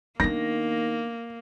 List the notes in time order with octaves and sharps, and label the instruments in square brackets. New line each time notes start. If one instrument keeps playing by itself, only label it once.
[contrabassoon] D#3 [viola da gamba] A#3 [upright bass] B3 D4 [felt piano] A#6